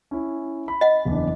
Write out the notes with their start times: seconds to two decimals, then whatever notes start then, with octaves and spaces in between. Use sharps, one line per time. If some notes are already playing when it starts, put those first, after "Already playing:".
0.11 C#4 E4
0.68 B5
0.81 D#5 F#5
1.05 F#1 E2 D4